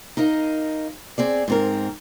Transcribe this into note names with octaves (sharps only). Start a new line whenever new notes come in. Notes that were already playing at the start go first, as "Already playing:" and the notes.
D#4 A#4 D#5 F5
C4 G#4 D5
G#2 C4 A#4